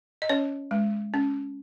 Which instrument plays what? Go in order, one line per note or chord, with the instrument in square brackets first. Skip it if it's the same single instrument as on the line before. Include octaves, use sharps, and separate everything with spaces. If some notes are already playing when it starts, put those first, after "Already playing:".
[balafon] D#5
C#4 C#5
G#3
C#4